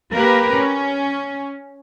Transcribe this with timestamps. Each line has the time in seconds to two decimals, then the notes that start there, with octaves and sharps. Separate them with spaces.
0.15 A#3 G4 A#4 B4
0.55 C#4